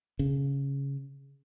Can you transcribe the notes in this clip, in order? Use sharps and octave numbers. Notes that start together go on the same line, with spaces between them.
C#3